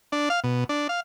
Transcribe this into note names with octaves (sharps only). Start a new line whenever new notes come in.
D4
F5
B2
D4
F5